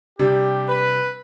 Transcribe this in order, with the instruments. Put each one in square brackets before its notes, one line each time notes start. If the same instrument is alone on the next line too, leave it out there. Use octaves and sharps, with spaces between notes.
[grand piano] C3 G3 D4 [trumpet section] G4
[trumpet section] B4